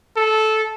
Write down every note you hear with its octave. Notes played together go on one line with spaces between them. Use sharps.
A4